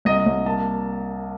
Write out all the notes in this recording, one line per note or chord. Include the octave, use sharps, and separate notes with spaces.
C2 D#5
C2
A#3 A5